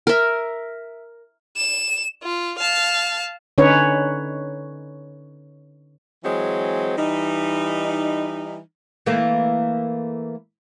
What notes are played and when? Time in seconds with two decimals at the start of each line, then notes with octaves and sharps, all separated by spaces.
0.07 A#4 E5
1.57 E7
2.23 F4
2.58 F5 A5
3.58 D3 C#4 D#4 B4 C#5
6.24 E3 F#3 G#3 C4
6.97 E3 G3 D#4
9.06 E3 A3 A#3